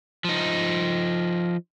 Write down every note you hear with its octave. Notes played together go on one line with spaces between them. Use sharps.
F3 D#4